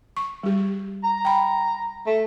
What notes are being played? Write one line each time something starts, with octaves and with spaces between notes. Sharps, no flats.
C#6
G3 G4
A#5
G5 B5
A3